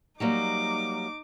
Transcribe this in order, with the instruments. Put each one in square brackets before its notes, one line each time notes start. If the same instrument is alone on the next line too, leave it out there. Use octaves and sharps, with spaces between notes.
[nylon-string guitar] F#3 G3 A#3 [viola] D#4 D6